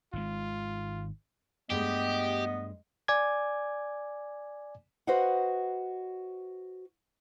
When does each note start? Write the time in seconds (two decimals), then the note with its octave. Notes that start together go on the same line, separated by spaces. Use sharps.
0.13 G#1 D#3 G#3 F4
1.70 G2 G#3 A3 B3 G4 D#5
3.08 D5 G#5 D6 G#6
5.07 F#4 B4 C5 D#5 F5 F#5